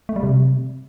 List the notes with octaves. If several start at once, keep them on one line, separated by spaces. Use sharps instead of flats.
A3
G3
C3